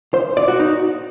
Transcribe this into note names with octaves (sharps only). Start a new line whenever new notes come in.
C5
D5
F#4
D#4